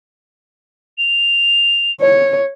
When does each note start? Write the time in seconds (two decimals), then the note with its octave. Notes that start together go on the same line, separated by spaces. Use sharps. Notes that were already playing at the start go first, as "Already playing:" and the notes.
0.98 F7
2.01 C#5